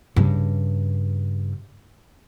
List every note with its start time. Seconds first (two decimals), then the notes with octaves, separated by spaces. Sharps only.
0.16 G2 C#3